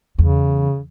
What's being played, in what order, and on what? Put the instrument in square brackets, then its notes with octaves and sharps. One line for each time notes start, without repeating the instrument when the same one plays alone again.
[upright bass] E2 [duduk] C#3